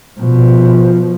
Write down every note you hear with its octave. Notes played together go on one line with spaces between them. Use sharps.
B2 F3